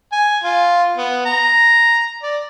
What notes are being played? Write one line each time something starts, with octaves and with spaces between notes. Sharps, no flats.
G#5
F4
B3
A#5
D5